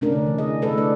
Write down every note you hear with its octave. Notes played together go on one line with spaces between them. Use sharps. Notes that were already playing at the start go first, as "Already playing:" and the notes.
C3 A3 C#4 D4 A#4
D3
E3
D4 G#4 D#5
E3 A3 A4 B4
D4 D5